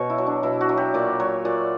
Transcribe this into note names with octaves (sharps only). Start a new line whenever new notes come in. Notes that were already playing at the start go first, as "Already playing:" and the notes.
Already playing: B2 C#5
E4
F#3
D4
B2 E4
F#4
F#3
G4
A#2 D5
F#3 C#5
A#2 D5